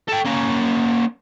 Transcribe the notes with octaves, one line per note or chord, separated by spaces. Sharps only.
A4 G5
A#3 C#4